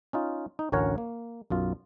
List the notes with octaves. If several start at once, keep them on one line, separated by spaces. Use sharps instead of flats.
C#4 D#4 F4
D#4
A1 D2 C#4 A#4 C#5 F#5
A#3
B1 F#2 F4